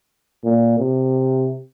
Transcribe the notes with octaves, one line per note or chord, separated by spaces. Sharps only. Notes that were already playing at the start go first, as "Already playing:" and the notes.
A#2
C3